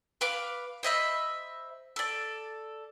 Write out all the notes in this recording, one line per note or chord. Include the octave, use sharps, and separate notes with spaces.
B4 F5 D6
C5 D#5 E5 B5
A4 D5